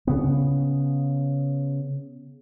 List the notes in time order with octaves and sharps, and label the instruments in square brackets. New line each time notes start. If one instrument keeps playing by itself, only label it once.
[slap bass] C#3 B3